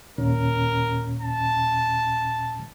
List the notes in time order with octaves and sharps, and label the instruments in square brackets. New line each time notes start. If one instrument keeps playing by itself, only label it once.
[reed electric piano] D#2 A#2 C#4 [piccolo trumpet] A#4
[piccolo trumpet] A5